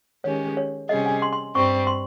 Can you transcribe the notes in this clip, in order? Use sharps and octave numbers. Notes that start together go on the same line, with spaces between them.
D#3 G#3 C#4 G4 C#5
C#5
C3 G3 C#4 G#4 D#5
G#5
C6
C6
G2 G3 C4 C#6
C6